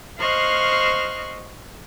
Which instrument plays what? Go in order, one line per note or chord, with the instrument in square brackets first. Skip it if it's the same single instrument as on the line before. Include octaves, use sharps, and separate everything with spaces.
[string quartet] C5 D#5 F5 C#6 F6 F#6